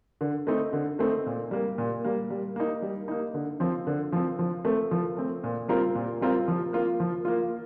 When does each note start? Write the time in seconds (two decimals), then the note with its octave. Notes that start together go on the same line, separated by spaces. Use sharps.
0.21 D3
0.47 A3 C4 D#4
0.73 D3
0.99 A3 C4 D#4
1.26 A#2
1.51 G3 A#3
1.78 A#2
2.04 G3 A#3
2.30 G3
2.56 A#3 D#4
2.82 G3
3.08 A#3 D#4
3.34 D3
3.60 F3 C4
3.87 D3
4.12 F3 C4
4.39 F3
4.65 A3 C4
4.91 F3
5.17 A3 C4
5.43 A#2
5.68 G3 C4 F4 A#4
5.95 A#2
6.21 G3 C4 F4 A#4
6.48 F3
6.73 A#3 F4
7.00 F3
7.25 A#3 F4